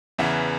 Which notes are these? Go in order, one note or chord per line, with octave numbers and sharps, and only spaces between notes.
E2 C#3 E3 E5 F#5